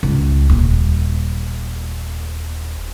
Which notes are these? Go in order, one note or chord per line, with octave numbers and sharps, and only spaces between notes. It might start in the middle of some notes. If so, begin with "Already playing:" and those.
C#2
D#1